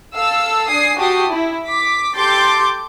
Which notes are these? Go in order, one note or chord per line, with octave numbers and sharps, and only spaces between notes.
A4 F5 E6
D4 G#5 D#6 C7
F#4 G4 A5 D#6 C7
E4
D6 B6
G4 A4 C6 D6 G6 A6